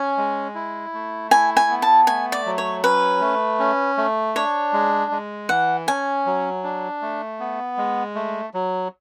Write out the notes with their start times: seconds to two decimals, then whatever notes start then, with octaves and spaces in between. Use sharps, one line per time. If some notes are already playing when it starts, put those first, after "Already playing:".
Already playing: C#4 G#5
0.17 G#3
0.55 E4
0.94 A3
1.31 E4 G#5
1.57 G#5
1.70 B3
1.82 A5
2.07 A3 G#5
2.32 D5
2.46 F#3
2.58 C#5
2.83 C#4 B4
3.21 A3
3.59 C#4
3.97 A3
4.35 D4 C#5
4.73 G#3
5.11 G#3
5.49 E3 F#5
5.87 C#4 G#5
6.26 F#3
6.64 D4
7.02 A3
7.40 B3
7.78 G#3
8.15 A3
8.54 F#3